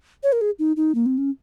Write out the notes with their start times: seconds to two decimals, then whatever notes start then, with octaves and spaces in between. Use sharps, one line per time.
0.23 C#5
0.32 A#4
0.41 G#4
0.59 D#4
0.76 D#4
0.95 A#3
1.06 C4
1.18 C#4